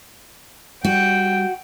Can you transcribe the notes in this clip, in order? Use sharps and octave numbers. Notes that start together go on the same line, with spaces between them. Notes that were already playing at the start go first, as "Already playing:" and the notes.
G3 F#4 G5